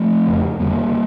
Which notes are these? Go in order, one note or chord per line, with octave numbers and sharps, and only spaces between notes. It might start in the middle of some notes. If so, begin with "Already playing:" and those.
Already playing: F3 A3
F2 C#3
F2 D3 G3 A#3